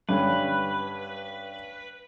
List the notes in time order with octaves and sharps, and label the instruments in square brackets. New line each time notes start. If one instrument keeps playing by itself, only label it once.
[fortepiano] G2 D3 C#4 [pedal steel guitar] B4